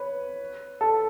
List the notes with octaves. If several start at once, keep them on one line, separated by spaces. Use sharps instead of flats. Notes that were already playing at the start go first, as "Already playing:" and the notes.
Already playing: B4 C#5
A4